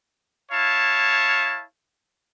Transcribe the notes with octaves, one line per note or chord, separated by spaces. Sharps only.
E4 C#5 F5 A5